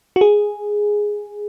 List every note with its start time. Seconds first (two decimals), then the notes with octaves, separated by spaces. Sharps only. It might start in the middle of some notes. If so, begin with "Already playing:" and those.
0.16 F#4
0.21 G#4